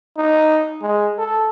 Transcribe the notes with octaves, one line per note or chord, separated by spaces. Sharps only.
D#4
G#3
A4